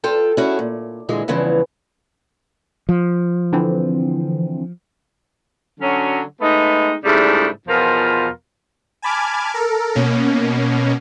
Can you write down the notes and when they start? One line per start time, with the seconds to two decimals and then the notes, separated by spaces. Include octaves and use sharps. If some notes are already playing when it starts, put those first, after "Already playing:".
0.04 F4 A4 G5 A5
0.37 C#4 D#4 E4 F#4 G#4 A4
0.59 A#2
1.09 A#2 D3 E3 G#3
1.28 E2 G2 C#3 E3 F3
2.89 F3
3.53 D3 E3 C4
5.80 D3 F#3 C#4
6.41 G#3 A3 B3 D#4
7.04 G#2 C#3 G3 A3 D4 E4
7.68 E2 B2 F3 B3 F4 A#4
9.02 G#5 A5 B5 D6 F6 G#6
9.54 A4 A#4
9.95 B2 A#3 C#4